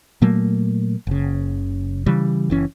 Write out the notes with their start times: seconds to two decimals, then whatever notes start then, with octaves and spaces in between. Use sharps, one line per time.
0.22 A#2 F#3 A3 A#3
1.07 F#1 C#3
2.06 C#3 E3 G3
2.50 F#1 E3 C#4